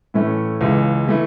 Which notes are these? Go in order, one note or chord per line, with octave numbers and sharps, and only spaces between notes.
A2 E3 A3 C#4
C#2 C#3 E3 G#3
E3 A3 E4